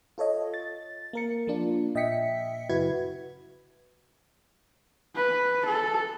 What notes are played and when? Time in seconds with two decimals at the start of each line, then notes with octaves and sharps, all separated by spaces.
0.18 F4 A4 C#5 D#5
0.54 A6
1.13 A#3 A#4 C#7
1.47 F3 A#3 D4 F4
1.95 A#2 D#5 E5 G5 B6 C#7
2.69 F#2 C#3 E4 F#4 B4 G#6
5.16 B4
5.66 A4